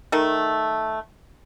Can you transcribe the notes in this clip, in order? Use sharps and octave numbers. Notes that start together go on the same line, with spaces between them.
D#3 A3